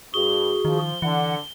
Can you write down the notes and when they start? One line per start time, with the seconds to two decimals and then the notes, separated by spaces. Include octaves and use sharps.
0.14 G2 F#4 G#4 G7
0.65 D#3 F3
1.02 D3 E3 F#5